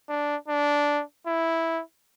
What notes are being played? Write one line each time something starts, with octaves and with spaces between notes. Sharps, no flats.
D4
D4
E4